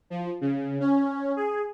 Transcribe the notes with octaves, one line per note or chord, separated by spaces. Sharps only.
F3
C#3
C#4
G#4